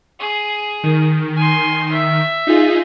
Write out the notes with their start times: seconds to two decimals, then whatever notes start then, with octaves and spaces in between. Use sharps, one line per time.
0.20 G#4 D#7
0.83 D#3
1.37 G#5 C6
1.92 E5
2.47 D#4 F4 G#4